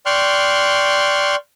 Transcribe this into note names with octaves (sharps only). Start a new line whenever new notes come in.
D5 G5 C6 C#6 F6 F#6